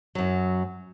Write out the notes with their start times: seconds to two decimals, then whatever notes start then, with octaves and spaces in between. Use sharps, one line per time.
0.15 F#2 F#3